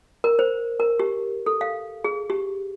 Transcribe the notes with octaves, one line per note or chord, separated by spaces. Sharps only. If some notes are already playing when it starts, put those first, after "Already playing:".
A#4
C5
A#4
G4
A4
F5
G#4
G4